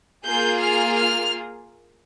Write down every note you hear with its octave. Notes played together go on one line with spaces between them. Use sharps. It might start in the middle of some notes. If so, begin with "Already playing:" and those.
A#3 F4 G#4 G6
F6
F6